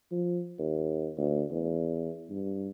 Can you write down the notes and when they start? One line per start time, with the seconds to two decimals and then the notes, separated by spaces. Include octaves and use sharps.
0.11 F3
0.59 D#2
1.18 D2
1.51 E2
2.30 G2